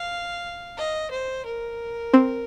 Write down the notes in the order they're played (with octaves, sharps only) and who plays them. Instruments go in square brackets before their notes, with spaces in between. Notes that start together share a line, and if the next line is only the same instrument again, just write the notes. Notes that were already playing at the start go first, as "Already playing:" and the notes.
Already playing: [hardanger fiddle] F5
D#5
C5
A#4
[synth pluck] C4